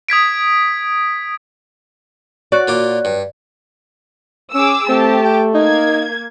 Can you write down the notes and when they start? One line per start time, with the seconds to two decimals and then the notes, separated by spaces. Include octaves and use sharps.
0.09 D#6 G#6 B6 D7
2.52 F#4 C#5 D5 F#6
2.68 A#2 F4 D6
3.05 G2
4.55 C#4 G#4 D6 E6
4.89 A3 C4 G4 A5
5.25 G5
5.54 A#3 D#4 G#6